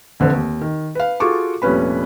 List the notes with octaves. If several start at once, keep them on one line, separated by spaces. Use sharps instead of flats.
F1 D3 B4 C5
D#2
D#3
B4 F5
F4 F#4 G#4 A4 C#6 D6
F1 A#2 G3 C#4 B4 B5